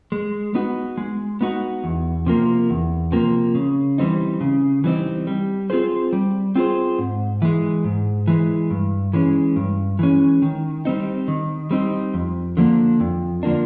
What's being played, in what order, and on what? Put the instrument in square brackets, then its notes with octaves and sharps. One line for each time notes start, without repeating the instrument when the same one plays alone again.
[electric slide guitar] G#3
B3 D#4 F#4
G#3
B3 D#4 F#4
E2
C3 F3 A#3
E2
C3 F3 A#3
C#3
E3 G3 C4 D#4
C#3
E3 G3 C4 D#4
G3
C4 F4 G#4 C5
G3
C4 F4 G#4 C5
G#2
E3 G#3
G#2
E3 G#3
G2
E3 G#3 C#4
G2
E3 G#3 C#4
D#3
G3 C4 D#4
D#3
G3 C4 D#4
F2
D3 F3 A#3 D4
F2
D3 F3 A#3 D4